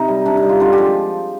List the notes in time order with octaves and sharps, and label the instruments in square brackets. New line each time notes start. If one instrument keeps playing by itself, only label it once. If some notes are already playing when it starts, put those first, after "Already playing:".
Already playing: [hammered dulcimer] C3 D#4
G3
C3 D4
D#4
G3
F4
D3 F4
G4
F3 G#3